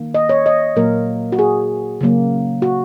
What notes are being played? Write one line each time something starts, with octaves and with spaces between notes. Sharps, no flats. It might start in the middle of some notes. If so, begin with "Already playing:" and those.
Already playing: D#3 A#3
D#5
C#5
D#5
A#2 F#3 A#3 A#4
F#4
G#4
C#3 F#3 A#3
F#4